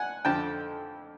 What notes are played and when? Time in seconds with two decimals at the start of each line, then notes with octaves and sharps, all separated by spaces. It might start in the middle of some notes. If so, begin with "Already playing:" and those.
Already playing: F#5 G#5
0.25 F2 D3 F3 G5 A5